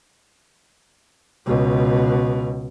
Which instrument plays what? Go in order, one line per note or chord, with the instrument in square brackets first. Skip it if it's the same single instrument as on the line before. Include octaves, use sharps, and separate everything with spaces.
[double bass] C#2 B2